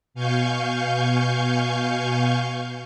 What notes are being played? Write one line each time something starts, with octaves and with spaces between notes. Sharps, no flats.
B2 F5 G#5 C#6 G6